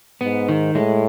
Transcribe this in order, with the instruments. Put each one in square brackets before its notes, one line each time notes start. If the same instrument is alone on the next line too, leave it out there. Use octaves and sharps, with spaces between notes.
[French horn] G#2 [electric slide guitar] B3
[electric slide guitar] D#3
[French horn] A2 [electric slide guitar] G#3